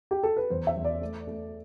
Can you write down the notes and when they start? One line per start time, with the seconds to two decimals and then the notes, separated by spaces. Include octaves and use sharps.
0.11 G4
0.23 A4
0.37 B4
0.50 E2 C5
0.67 E5
0.76 E2
0.85 D5
1.01 A3
1.27 A3